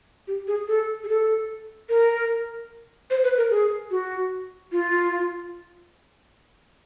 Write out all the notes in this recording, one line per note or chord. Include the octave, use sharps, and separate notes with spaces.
G4
G#4
A4
G#4
A4
A#4
C5
B4
A#4
G#4
F#4
F4